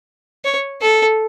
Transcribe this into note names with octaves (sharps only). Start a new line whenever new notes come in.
C#5
A4